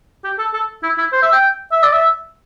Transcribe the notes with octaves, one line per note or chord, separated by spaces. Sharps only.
G4
A4
A4
E4
E4
C5
E5
G5
E5
D5
E5